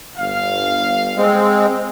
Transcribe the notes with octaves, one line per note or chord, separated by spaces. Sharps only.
G1 F5
G#3 C4